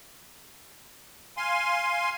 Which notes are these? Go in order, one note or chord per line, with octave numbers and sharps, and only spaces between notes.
F5 G#5 C6